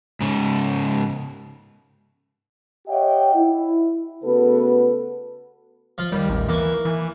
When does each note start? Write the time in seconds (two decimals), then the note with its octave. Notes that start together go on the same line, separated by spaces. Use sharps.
0.21 G#2 C#3
2.88 G4 C#5 D#5 E5 F#5 G5
3.35 E4
4.24 C#3 A3 B3 F#4 A4 B4
5.98 F3 F4
6.12 D#2 G3
6.29 A1
6.49 E3 A#3 C#6
6.85 E3